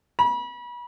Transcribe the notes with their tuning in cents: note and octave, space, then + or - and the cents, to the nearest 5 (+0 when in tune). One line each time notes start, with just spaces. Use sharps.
B5 -35